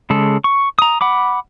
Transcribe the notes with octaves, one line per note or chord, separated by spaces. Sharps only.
C#3 G#3 A4
C#6
A#5 D#6
F#5 B5 D6